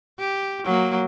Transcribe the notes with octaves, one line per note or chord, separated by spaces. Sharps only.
G4
F#3 A#3